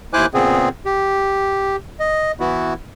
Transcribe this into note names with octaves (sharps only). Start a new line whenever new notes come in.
D#2 E4 C5 G#5 D6 F#6
A#2 C#3 B3 C4 G#4
G4
D#5
E3 B3 E4 F#4